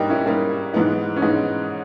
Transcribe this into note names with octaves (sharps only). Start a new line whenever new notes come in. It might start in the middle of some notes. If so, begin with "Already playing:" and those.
Already playing: G#2 G3 A#3 D#4 G4 C#5
C#4 E4
G#2 G3 A#3
G#2 E3 G#3 B3 D#4
C#4
G#2 E3 G#3 B3 D#4